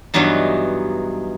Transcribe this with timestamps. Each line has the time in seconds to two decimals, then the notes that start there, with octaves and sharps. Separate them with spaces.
0.14 G2 E3 F#3 B3 D#4